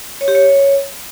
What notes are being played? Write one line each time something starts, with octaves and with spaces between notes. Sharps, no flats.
C#5
G4
C#5